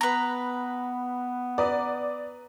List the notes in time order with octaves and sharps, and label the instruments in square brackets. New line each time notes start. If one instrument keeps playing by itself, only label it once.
[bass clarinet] B3 [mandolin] B4 A#5
[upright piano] B4 A#5 D#6 [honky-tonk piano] D5